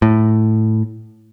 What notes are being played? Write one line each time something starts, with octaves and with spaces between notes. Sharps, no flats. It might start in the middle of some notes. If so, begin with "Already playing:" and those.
A2